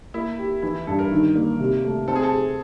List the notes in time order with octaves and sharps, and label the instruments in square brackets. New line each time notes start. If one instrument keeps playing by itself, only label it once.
[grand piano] A#3 [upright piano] E4
[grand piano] G4
[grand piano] E3 [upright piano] E4
[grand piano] G2 [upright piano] A4
[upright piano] A#4
[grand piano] D#3
A#3
C3
A3
[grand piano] C4 [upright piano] A4
[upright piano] G#4
A4
[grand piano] G#4